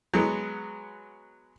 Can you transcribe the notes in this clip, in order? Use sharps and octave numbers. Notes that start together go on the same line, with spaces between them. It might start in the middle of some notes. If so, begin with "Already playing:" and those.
F#3 G#3 B3